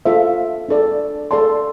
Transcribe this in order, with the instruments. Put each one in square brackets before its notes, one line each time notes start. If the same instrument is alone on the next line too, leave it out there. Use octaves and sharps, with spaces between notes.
[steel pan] F4 A4 C5 E5
D4 A4 D5
A4 D5 A5 C6